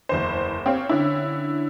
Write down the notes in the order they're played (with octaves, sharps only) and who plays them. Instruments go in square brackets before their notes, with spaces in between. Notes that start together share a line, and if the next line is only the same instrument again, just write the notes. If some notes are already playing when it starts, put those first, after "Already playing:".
[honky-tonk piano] F#1 E2 C5
C4 G4 C#5 F5
D3 C#4 E4